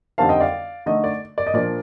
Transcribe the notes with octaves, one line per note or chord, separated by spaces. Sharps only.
F2 D3 G3 C4 D#4 F5 A5
D#5 G5
D5 F5
D3 A3 D#4 D#5
D5
D5
D#5
A#2 F3 A#3 D4 D5